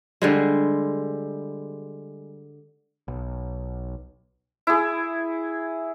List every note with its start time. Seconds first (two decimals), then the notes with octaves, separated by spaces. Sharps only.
0.22 D3 G3 G#3
3.08 B1
4.67 E4 G#4